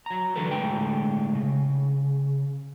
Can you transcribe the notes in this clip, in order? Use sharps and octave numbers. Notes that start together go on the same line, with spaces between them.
F#3 A#5
D3 E3 F#3 A4 B4
A2 D3 G#3 G5
C#3